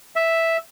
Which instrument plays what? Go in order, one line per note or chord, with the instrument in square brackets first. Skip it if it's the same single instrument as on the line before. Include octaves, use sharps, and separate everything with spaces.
[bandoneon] E5